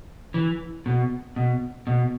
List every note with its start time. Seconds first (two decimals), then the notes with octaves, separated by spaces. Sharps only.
0.34 E3
0.86 B2
1.36 B2
1.87 B2